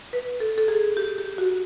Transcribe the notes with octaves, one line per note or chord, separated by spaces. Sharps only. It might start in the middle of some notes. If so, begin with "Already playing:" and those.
B4
A4
A4
G#4
G4
G4
F#4